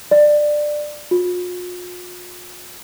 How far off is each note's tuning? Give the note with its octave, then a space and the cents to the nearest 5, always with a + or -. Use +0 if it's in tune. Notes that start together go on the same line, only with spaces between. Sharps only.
D5 +15
F4 +45